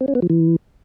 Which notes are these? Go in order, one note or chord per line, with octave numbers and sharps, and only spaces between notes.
C4
C#4
B3
F3
E3